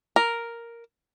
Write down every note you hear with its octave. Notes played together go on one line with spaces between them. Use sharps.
A#4